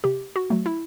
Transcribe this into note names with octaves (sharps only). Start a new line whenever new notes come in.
C3 G4
F#4
F#3 A3
E4